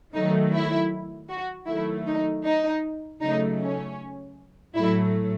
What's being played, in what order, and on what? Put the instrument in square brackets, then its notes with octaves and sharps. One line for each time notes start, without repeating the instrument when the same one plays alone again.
[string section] D#3 F#3 A3 D#4
E4
F#4
D#3 F#3 A3 E4
D#4
D#4
C#3 F#3 A3 D#4
C#4
A2 F#3 A3 E4